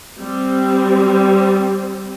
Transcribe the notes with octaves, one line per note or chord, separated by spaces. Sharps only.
G3 C4